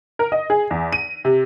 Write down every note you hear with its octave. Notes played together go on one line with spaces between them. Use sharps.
A#4
D#5
G#4
E2
D#7
C3